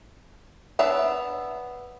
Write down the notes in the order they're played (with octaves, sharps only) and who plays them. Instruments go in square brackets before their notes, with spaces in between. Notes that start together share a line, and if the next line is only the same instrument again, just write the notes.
[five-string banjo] B3 D4 C#5 E5